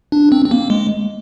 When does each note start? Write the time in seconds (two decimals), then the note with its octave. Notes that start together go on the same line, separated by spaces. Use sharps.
0.12 D4
0.32 C4
0.46 C4
0.51 A#3
0.70 G#3